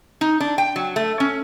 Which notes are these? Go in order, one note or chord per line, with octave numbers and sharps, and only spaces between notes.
D#4
D4
G5
F#3
A3
C#4